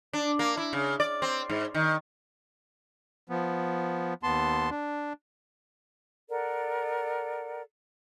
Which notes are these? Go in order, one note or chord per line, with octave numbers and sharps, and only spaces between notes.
D4
A#3
E4
C#3
D5
C4
G#2
D#3
F3 B3
D#2 B3 A5 C6
D4
A4 A#4 D5 F#5